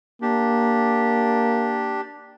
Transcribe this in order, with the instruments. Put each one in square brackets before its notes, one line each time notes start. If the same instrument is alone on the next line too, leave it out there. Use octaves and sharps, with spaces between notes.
[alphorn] A#3 [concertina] D4 G4